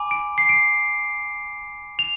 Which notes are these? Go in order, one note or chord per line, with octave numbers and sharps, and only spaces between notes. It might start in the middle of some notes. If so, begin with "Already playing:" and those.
Already playing: G#5 B5 D6
D7
C7
D7
F7